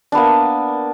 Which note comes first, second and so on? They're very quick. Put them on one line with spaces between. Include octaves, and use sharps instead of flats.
D4 B3 A#3